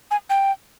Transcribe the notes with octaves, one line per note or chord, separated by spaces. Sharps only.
G#5
G5